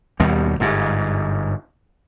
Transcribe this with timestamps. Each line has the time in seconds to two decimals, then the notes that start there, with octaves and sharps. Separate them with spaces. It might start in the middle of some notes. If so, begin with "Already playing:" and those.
0.20 D#2 B2 G3
0.60 G1 G#2